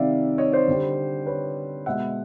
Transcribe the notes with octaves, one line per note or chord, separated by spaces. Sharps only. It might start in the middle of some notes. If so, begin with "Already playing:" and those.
Already playing: C3 D#3 G3 D5 E5 F5
C#5 D#5
C5 D5
D3 G3
B4 C#5
B2 G#3 E5 F#5